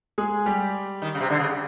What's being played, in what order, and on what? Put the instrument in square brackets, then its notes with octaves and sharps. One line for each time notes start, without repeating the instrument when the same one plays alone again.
[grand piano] G#3 G#4
G3 G4
[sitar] D#3
C#3
C3
D3
C#3